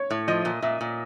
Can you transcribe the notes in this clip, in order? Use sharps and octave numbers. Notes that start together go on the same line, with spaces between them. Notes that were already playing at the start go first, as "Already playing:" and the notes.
Already playing: C#5
A2
F3 D#5
A#2
A#2 E5
A#2